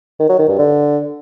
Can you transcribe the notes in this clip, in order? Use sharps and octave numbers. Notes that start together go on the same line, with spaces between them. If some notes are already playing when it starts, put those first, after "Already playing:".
D#3
F#3
D#3
G2
D3